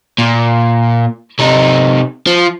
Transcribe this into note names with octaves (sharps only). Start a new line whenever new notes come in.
A#2
C3 D#4
F3